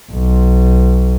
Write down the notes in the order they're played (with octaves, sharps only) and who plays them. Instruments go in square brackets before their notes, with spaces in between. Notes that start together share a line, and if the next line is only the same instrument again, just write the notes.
[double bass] B1